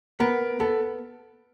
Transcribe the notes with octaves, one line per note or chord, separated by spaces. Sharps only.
B3 A#4
B3 A4